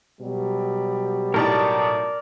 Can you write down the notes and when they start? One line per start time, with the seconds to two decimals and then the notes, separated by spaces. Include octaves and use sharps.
0.20 B2 F#3 G3
1.34 A2 D#4 A#4 D5 A5